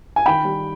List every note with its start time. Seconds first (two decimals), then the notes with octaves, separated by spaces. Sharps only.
0.16 G#5
0.26 D#3 G5 B5
0.45 G3